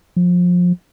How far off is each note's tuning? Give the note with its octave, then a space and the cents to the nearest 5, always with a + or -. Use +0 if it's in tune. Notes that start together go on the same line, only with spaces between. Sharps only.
F3 +25